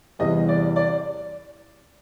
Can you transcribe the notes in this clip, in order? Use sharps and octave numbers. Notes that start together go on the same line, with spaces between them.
E2 C3 E3 G3 D#5
D5
D5